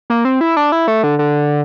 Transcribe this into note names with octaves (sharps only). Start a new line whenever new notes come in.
A#3
C4
E4
D4
E4
A3
D3
D3